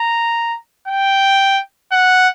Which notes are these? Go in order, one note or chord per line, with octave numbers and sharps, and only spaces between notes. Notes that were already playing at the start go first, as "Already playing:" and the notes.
Already playing: A#5
G5
F#5